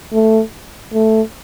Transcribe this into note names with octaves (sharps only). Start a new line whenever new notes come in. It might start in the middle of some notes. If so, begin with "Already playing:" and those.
A3
A3